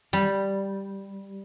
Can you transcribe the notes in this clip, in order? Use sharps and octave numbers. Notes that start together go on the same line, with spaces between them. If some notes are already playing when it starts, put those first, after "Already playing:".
G3